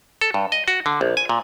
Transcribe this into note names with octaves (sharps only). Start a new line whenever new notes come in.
A4
G2
D#5
F#4
D3
A#1
G#5
A#2